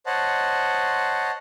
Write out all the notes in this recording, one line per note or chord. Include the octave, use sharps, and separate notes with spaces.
C5 C#5 D#5 F#5 A5